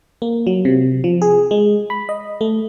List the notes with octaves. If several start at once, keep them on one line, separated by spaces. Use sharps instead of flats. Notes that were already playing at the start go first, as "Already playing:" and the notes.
A#3
F#3
C3
F3
G#4
G#3
B5
D#5
A3